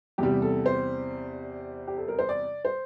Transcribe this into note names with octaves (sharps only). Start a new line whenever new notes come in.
E2 C3 G3 G4
A4
C5
G4
A4
A#4
C5
D5
C5